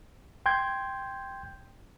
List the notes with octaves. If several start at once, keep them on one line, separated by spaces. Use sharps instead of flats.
G5 C6 G6 G#6